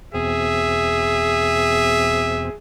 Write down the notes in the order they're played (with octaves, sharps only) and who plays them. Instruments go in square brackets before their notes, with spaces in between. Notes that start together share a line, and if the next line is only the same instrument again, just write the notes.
[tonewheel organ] E2 B2 C4 [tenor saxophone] G#4 [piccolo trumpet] E5